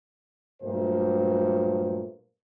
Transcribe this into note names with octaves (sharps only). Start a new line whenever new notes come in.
G2 A#2 F#3 A3 C5